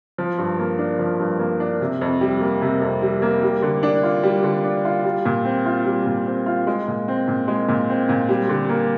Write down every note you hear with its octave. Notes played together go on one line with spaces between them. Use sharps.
F3
G2
A#3
D4
F3
G2
A#3
D4
C3
F2
G3
A#3
C3
F2
G3
A#3
G3
D3
D4
F4
G3
D3
D4
F4
G3
A#2
C4
F4
G3
A#2
C4
F4
G#3
A#2
C4
A#2
G#3
A#2
C4
A#2
G3
D3
A#3